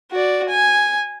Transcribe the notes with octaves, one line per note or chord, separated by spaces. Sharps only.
F#4 D5
G#5